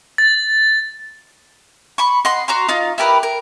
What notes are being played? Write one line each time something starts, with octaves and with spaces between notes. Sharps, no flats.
A6
B5 C#6
D#5 F#5 C6
F#4 A#5 C6
D#4 F4
E4 G4 A#4 B4
A#4